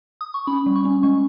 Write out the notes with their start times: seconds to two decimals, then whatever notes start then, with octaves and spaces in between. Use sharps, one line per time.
0.21 D#6
0.34 C#6
0.47 C#4 B5
0.66 G3
0.75 C#6
0.85 C#4
1.03 G#3 C#6